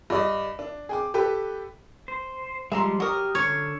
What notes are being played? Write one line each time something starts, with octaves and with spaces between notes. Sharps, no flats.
G2 D5 D#5
D4
G#4 G5 D6
G4 A4 B4 G5
C5
F3 G3 G#3 E5 A#5 C6
F#3 G4 A#4 D#6
D3 C#5